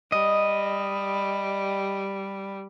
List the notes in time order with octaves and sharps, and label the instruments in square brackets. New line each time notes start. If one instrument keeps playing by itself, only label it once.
[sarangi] G3 [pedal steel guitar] D#5